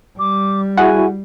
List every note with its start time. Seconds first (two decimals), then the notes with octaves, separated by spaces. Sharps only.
0.19 G3 D6
0.77 E4 F#4 G#4 F#5 G#5